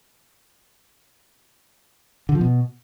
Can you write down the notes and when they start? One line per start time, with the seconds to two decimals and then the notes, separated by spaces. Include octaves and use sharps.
2.29 D3
2.35 F3
2.41 B2